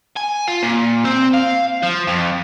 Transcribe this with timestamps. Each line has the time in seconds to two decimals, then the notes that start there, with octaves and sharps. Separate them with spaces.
0.17 G#5
0.48 F4
0.63 A#2
1.05 C4
1.34 F5
1.83 F3
2.07 F2